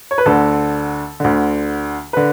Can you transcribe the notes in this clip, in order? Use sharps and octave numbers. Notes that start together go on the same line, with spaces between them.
C#5
B4
D2 D3 A4
D2 D3
D3 B4